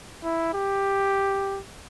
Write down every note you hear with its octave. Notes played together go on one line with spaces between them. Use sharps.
E4
G4